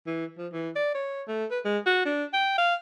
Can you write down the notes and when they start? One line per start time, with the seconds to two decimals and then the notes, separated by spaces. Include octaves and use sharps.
0.06 E3
0.38 F3
0.53 E3
0.76 D5
0.95 C#5
1.28 A3
1.51 B4
1.65 G#3
1.86 F#4
2.06 D4
2.33 G5
2.58 F5